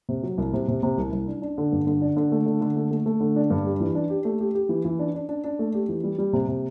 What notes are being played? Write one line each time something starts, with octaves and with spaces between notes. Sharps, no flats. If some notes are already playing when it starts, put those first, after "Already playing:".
C3
F#3
C2
C3
C3
C3
C2
C2
D4
D4
D3
G2
D3
D4
D3
A3
D3
D3
A3
A3
A3
D3
D4
G2
G4
E3
D4
G4
A3
G4
G4
E3
E3
D4
D4
D4
D4
A3
G4
E3
G3
G3
C3
C3